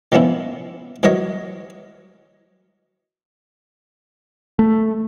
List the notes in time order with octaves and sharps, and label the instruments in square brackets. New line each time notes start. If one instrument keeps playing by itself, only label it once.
[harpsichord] D#3 F3 B3 C#4 E4
E3 F#3 A#4 C#5 D#5
[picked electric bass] A3